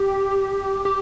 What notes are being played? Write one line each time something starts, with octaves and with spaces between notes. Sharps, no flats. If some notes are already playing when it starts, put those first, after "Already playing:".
Already playing: G4
G4